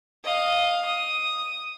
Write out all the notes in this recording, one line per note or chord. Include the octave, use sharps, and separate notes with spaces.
D#5 F5
D#6